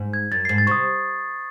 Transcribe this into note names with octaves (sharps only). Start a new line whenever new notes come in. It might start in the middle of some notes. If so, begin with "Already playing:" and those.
Already playing: G#2
G#6
F#2 A6
G#2 C7
A6
C3 C#6 D#6